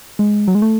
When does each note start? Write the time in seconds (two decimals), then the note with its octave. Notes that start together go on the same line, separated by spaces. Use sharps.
0.19 G#3
0.48 F#3
0.55 G#3
0.62 A3